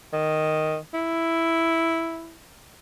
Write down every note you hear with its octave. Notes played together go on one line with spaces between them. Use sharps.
D#3
E4